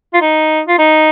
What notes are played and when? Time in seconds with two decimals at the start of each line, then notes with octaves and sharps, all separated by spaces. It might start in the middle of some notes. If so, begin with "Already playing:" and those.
0.14 F4
0.21 D#4
0.68 F4
0.79 D#4